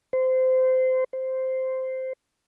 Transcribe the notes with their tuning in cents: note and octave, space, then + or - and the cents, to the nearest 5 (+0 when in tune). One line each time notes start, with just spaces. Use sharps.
C5 -20
C5 -5